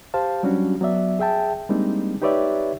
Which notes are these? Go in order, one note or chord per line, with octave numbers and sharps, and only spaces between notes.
G4 C5 F5 A5
F#3 G3 C#4 D4 F#4
F#3 B3 D5 E5
G#4 E5 G5 A5
G3 G#3 A#3 C4 D4 D#4
D#4 G4 B4 C#5 D5 E5